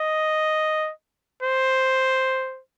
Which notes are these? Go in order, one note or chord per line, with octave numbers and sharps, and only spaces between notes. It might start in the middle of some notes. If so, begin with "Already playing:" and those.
Already playing: D#5
C5